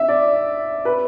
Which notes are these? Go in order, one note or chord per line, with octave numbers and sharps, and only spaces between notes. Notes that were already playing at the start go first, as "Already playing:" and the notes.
Already playing: E5
D5
B4